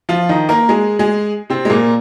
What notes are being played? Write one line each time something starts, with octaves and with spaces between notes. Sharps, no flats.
F3 F4
D#3 D#4
A#3 A#4
G#3 G#4
G#3 G#4
C3 C4
G#3
A#2 A#3